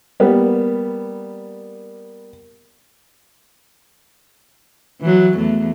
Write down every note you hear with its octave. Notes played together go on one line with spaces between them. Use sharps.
G3 A#3 B3
E3 F#3
E2 A3